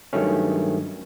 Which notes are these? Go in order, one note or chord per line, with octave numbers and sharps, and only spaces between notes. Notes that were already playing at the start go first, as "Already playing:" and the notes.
G2 D#3 F#3 A3 C#4